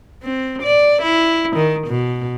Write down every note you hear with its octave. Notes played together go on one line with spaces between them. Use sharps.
C4
D5
E4
D#3
B2